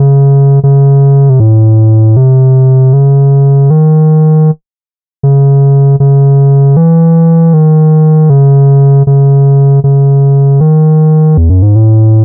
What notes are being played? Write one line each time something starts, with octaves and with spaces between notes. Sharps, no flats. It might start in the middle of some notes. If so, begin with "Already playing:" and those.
Already playing: C#3
C#3
C3
A2
C3
C#3
D#3
C#3
C#3
E3
D#3
C#3
C#3
C#3
D#3
E2
F#2
G#2
A2